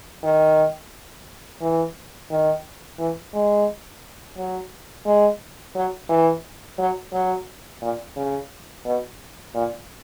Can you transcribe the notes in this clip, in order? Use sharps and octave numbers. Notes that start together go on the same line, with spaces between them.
D#3
E3
D#3
E3
G#3
F#3
G#3
F#3
E3
F#3
F#3
A#2
C#3
B2
A#2